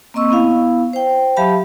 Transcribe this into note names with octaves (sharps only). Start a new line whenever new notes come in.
A#3 C4 D#5 C#6 E6
B3 E4 F5
C5 G5
F#3 G4 E5 F5 A5 B5